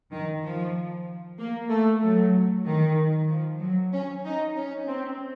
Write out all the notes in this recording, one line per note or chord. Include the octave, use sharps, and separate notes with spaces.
D#3
F3
A#3
A3
F#3
D#3
F3
F#3
C#4
D#4
C#4
C4